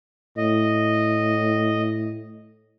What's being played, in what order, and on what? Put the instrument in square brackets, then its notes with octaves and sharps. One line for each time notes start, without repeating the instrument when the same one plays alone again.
[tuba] A2 [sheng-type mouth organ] D#5